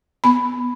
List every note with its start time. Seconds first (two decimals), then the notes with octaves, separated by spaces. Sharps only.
0.24 B3 B5